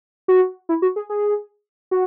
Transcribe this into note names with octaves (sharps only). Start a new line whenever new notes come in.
F#4
E4
F#4
G#4
G#4
F#4